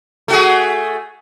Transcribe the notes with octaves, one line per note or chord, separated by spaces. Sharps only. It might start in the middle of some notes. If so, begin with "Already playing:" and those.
A3 F#4 G#4